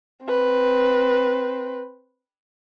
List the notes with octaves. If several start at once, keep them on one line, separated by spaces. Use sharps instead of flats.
C4 B4